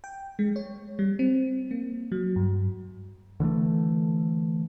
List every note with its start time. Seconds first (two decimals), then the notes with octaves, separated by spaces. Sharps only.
0.04 G5
0.39 G#3
0.56 C#5
0.99 G3
1.19 C4
1.71 A#3
2.12 F#3
2.36 G2
3.40 D3 E3 G#3 A3